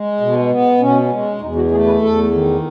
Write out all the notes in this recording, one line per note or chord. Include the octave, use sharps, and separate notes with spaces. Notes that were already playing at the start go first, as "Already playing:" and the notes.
Already playing: G#3
B2
B3
B2 C#4
G#3
E2 D#4
F#4
A3 G#4
B4
E2 A4
D#3